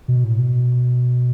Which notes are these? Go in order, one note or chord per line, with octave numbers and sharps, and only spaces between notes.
B2
A2
B2